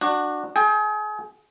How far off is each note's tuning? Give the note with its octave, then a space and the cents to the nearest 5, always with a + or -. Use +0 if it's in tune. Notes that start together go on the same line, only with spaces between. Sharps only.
D4 +20 F#4 +0
G#4 +35 G5 +25